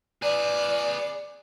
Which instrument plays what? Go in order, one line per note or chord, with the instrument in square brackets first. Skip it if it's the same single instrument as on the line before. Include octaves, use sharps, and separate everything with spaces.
[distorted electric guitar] G#4 B4 [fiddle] D5